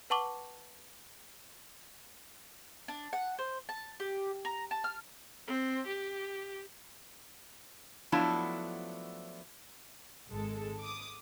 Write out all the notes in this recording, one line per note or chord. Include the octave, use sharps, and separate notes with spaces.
B4 F#5 A5 C#6 D6 F#7
D4
F#5
C5
A5
G4
A#5
A5
F6
C4
G4
F3 F#3 A3 B3 D4 E4
G#1 G#3 A4
D6 D#6